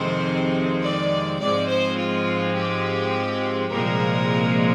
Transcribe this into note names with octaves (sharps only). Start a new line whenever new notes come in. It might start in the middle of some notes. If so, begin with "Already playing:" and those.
Already playing: F2 C3 D#3 G#3 C4 C5
D5
G#2 F3 G#3 C4 D5
C5
F4
G4
C2 A#2 F3 G#3 C4 A#4